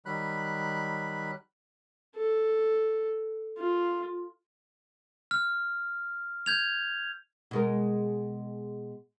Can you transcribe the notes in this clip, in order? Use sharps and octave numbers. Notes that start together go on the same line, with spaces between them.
D#3 F#3 G3 B5 F#6
A4
F4
F6
G6 G#6 F7
B2 G#3 A#4